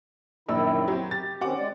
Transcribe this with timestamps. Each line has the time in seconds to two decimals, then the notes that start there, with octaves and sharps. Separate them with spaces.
0.49 A#1 F#2 D#3 D4 E4 E6
0.88 F#3 C4
1.11 G4 A6
1.41 D#3 C4 C#4 F#4 F#5 D6
1.58 G#3 D5